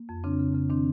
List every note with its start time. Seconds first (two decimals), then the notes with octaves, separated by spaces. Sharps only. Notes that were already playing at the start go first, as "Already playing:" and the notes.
Already playing: A#3
0.09 F2
0.24 C#3 C4 D4
0.40 C#3
0.55 C#3
0.70 D#3 C4 D4